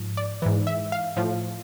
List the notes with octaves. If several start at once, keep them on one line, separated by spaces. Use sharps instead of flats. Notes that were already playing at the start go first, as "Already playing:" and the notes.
Already playing: G#2 F3
D5
G#2 E3
E5
F5
A2 F3